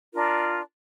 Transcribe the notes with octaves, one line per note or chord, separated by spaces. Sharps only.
D4 F4 A#4